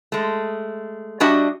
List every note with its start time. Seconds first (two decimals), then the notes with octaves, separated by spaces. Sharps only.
0.12 G#3 A3
1.20 G3 D4 F#4 G4 D#5 E5